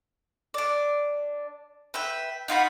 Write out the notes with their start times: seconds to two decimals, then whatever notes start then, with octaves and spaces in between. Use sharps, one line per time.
0.54 D4 D5
1.94 B4 E5 G5
2.48 D#4 F4 F#4 B5